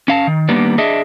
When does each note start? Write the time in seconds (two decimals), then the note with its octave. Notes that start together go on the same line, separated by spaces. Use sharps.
0.08 C#4 F5 A5
0.27 D#3
0.49 D#3 G3 A#3 B3 D4
0.78 D4 G#4 D#5 E5